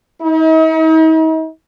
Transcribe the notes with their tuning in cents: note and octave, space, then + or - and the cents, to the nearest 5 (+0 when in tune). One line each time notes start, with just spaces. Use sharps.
D#4 +45